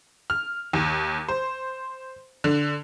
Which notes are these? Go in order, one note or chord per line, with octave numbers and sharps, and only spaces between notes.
F6
D#2
C5
D3